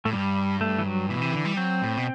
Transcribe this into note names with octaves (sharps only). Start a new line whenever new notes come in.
A2 A3
G2 G3
A3
E3
F#3
B2 E3
C3
D3
G3
F#3 C4
A2
B2